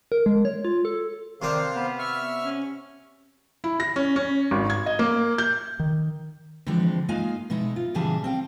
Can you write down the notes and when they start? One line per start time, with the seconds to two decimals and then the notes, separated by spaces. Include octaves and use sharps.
0.12 A#4
0.26 G#3
0.45 C#5
0.65 F4
0.85 A4
1.42 C3 D#3 D4 C5 F5
1.76 B3
1.99 E5 C#6 F6
2.45 C#4
3.64 E4
3.80 A#6
3.96 C#4
4.16 C#4
4.51 G#1
4.70 G#6
4.86 D#5
4.99 A#3
5.38 G6
5.79 D#3
6.66 D3 E3 F3 G#3 C4
7.09 G#3 A#3 D#4 F4 F5 G#5
7.50 B2 G#3 D#4 E4
7.76 F4
7.94 A#2 C#3 E3 G3 G#4 A5
8.24 C4 F5 G5